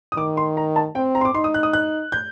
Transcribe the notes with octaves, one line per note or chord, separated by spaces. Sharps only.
D#6
D#3 D6
C6
A#5
A5
C4 G5
A#5
C6
D6
D#4 C6
D#6
F#6
D#6
F#6
G6